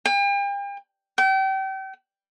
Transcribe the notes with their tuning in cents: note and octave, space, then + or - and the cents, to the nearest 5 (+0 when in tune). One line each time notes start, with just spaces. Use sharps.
G5 +40
G5 -35